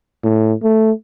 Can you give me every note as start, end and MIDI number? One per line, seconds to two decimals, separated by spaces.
0.24 0.53 45
0.63 0.91 57